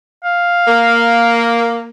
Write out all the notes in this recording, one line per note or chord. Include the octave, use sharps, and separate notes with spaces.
F5
A#3